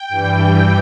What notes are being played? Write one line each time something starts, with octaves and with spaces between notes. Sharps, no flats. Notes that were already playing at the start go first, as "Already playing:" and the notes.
Already playing: G5
G2 E3 G3